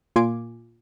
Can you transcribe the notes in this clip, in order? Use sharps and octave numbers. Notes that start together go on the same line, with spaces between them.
A#2 F4 G#5 C6 D6